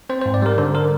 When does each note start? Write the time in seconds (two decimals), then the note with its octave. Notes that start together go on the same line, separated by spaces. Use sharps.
0.10 C4 C5
0.21 C5
0.26 G#2
0.34 D5
0.42 G3 A#4
0.58 D3 C5
0.75 D3 A#4